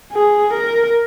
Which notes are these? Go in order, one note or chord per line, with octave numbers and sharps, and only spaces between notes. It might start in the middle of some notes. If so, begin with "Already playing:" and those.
G#4
A#4